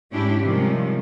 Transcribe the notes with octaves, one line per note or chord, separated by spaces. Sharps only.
G#2 G#3 C#4 D4 E4 G4
C3 D#3 F3 G3 G#3 C#4